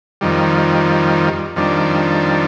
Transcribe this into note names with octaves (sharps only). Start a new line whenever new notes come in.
F2 D#3 G3
F2 D#3 G3 D4